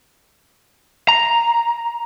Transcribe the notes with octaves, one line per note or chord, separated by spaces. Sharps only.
A#5